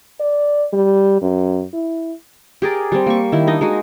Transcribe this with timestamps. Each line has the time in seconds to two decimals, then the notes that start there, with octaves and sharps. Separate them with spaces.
0.20 D5
0.73 G3
1.22 F#2
1.73 E4
2.62 G4 G#4 A#4 D5
2.92 G3 C4
3.06 A#3 C#6
3.32 D#3 E4
3.47 D4 D#4 D#5
3.61 G#3 D#4 F#4